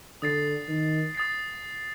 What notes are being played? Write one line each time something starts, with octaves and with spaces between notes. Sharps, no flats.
D3 D#6 A6 C7
D#3
D#6 A6 C7